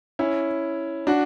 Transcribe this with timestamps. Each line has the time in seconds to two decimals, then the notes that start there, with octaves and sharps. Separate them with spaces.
0.19 C#4 E4
1.07 D4 F#4